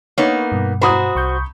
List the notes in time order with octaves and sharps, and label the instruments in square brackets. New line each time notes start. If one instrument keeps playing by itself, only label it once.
[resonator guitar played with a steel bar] A#3 B3 D#4 [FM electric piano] C#5
[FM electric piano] G2 B2
[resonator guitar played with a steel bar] F#4 C5 [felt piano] A#5 B5 D#6
[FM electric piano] C2 C#6 G6